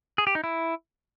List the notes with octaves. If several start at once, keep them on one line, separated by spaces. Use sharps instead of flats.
G#4
G4
D#4
E4